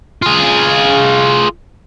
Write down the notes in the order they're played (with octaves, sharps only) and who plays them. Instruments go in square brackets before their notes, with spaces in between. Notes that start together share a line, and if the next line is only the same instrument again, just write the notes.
[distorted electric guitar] F4 G#4